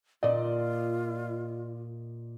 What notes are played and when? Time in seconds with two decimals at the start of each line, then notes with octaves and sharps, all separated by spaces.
0.23 A#2 F4 D5 D#5